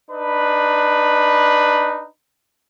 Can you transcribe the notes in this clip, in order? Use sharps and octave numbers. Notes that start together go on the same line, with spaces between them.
D4 D#4 B4